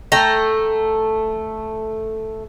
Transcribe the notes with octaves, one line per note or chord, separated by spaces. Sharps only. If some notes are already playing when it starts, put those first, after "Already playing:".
A3 A4 G5 A#5